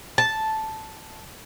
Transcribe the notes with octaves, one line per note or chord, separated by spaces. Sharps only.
A5